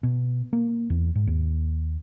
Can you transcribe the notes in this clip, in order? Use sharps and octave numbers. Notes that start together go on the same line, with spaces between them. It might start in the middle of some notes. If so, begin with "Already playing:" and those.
B2
A#3
E2
G#2
D#2